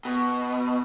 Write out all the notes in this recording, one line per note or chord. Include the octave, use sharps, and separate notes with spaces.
B2